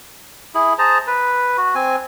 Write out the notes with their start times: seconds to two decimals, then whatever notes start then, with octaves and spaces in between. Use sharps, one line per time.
0.55 E4 G#4
0.79 G#4 C5 A5 A#5
1.07 B4
1.57 F#4
1.75 C4 G#5